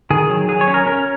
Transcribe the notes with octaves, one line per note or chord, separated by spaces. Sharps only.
D#3 G#4
F#3
F#3 G#4
C#5
C#4
A#4
C#4 A#4